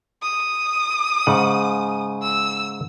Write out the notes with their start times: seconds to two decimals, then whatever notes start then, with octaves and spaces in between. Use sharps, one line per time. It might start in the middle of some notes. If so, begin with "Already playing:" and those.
0.22 D#6
1.26 G#2 C#3 F#5
2.22 E6